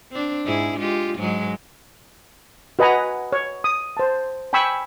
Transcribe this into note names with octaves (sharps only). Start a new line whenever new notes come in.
C4 D4
G#2 E4 G#4
G#3 F4 G4
G#2 F#3 G#3
F#4 B4 D#5 F#5 G#5 A#5
C#5
D#6
C5 A5
G5 G#5 B5 C#6 E6